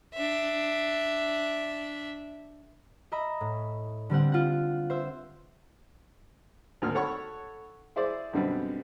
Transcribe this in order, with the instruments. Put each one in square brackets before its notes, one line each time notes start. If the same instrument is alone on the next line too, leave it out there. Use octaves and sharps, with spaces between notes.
[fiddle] D4 E5
[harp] D#5 E5 A#5 B5
A2
D3 G3 C4 F#5
F4 F#5
C5 E5
[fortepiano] G#1 D2 A#3 F6
A4 C#5 F#5 B5 C#6
E4 G#4 C5 D5
F#2 B2 D3 G3 B3 C4